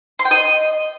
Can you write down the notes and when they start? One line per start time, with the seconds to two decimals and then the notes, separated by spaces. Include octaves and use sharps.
0.19 C6
0.25 G5
0.31 D#5